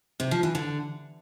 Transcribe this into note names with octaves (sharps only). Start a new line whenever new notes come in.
C3
F3
E3
D3